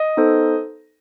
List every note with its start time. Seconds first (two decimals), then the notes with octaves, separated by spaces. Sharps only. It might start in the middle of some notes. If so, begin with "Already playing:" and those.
Already playing: D#5
0.17 B3 D#4 A4 C5